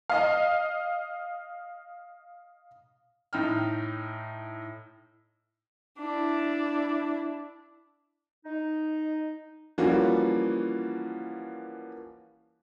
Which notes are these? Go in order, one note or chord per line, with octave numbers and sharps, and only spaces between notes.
D#5 F5
A2 D#4 G5 F6
D4 E4
D#4
E3 F3 G3 A#3 C#4 F#4